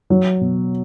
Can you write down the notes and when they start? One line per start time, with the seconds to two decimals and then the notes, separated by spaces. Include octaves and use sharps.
0.10 F#3
0.41 B2